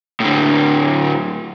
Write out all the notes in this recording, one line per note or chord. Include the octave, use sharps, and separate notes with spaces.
A2 D3